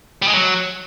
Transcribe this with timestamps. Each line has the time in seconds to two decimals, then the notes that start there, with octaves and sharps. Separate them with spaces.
0.22 G3
0.28 G#3
0.34 F#3